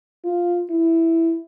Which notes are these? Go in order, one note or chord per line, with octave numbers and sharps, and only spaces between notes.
F4
E4